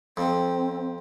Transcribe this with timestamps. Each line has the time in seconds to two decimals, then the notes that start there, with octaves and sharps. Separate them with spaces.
0.17 F2 C4